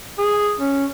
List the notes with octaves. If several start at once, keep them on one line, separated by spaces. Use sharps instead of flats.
G#4
C#4